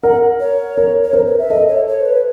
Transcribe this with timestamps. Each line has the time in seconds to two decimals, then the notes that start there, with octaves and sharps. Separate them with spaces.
0.03 A#4 F#5
0.40 C#5
0.77 A#4
1.04 C#5
1.13 A#4 C5
1.27 B4
1.39 E5
1.50 A4 D#5
1.69 C#5
1.88 C#5
2.01 C5
2.06 B4